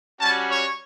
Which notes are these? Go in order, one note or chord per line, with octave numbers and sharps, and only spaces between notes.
G3 C#4 F#4 A5
C#5